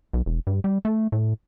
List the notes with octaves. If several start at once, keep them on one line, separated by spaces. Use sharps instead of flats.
B1
E1
G2
G3
A3
A2